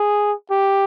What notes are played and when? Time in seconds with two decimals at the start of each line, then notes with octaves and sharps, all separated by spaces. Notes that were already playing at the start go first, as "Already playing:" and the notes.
Already playing: G#4
0.50 G4